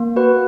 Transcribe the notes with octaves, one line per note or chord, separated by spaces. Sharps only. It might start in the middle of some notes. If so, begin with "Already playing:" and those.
Already playing: A#3
F#4 B4